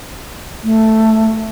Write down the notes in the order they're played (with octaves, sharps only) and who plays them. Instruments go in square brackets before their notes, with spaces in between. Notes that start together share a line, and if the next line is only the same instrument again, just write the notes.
[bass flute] A3